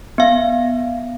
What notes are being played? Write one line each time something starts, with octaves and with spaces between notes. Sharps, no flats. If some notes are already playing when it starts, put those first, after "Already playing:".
B3 F5